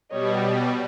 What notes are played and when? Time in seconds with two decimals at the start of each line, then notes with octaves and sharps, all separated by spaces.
0.11 B2 G3 C#5 D#5